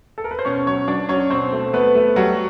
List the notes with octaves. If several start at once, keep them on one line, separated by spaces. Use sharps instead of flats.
A4
A#4
B4
C5
B2 C#4 C#5
F#3 C#4 C#5
F#3 D4 D5
F#3 C#4 C#5
B2 C4 C5
A3
A3 B3 B4
A3
F#3 G3 F#4